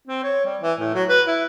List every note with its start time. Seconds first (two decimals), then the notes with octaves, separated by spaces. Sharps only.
0.08 C4
0.23 C#5
0.46 G3
0.62 E3
0.80 A2
0.95 F#3
1.09 B4
1.27 E4